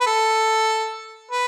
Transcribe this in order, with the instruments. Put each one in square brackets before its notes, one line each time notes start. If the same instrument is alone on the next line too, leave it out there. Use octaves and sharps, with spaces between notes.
[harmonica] B4
A4
B4